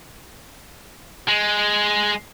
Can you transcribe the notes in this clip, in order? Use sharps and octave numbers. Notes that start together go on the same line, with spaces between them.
G#3